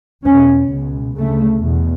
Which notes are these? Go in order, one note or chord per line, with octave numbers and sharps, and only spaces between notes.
E2 B2 C#4
C#2 B2
D2 C#3 A3
E2 B2